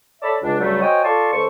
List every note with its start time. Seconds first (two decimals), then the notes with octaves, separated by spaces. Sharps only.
0.22 A4 C#5 D5 E5 A5 B5
0.42 C#2 D4
0.60 G2 C#3 F#3 G3 A3
0.80 F#4 C5 C#5 D#5 G5 G#5
1.04 F4 A4 D5 A5 C6 C#6
1.32 C#2 A4 C5 C#6